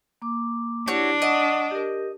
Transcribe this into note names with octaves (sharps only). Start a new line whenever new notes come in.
A#3 D6
D4 E4 F#4 G4 C#5
D#5 F#5 C#6
G4 A#4